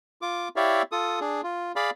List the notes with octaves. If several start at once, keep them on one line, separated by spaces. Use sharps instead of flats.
F4 D6
E4 G4 C#5 D5 E5 F5
F4 A4 D#6
D4 G#4
F4
G#4 D5 F5 B5